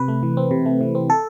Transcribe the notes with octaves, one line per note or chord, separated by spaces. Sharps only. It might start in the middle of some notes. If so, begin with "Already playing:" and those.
Already playing: C3 B4
A3
E3
C4
C3
A3
E3
C4
A4